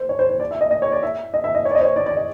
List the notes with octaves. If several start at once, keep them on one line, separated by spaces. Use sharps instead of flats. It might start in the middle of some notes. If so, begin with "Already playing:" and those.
Already playing: C5
C#5
C5
C5
D5
E5
D#5
D#5
C#5
D5
E5
D#5
E5
D#5
C#5
D5
D#5
C5
C#5
D5
D5
D#5